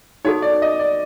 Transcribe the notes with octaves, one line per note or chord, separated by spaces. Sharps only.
D#4 F#4 A4 C#5
D5
D#5
D5